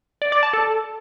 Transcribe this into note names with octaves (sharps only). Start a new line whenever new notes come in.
D5
D5
A5
A4